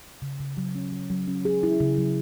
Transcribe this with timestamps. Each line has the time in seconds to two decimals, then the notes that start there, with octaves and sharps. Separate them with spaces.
0.22 C#3
0.40 C#3
0.57 F#3
0.75 C#4
0.92 F#3
1.10 F#3
1.28 C#4
1.45 G#4
1.63 E4
1.80 C#3
1.98 F#3